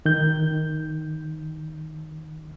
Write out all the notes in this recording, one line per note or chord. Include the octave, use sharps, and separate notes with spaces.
D#3 G6